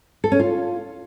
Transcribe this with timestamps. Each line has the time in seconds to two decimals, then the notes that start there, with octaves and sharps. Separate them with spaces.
0.24 A4
0.32 C#4
0.40 F4